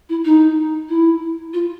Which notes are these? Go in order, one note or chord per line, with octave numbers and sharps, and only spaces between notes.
E4
D#4
E4
F4